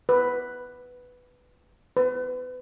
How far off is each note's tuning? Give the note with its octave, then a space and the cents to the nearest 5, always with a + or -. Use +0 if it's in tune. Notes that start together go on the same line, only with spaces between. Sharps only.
B4 +5
B4 +35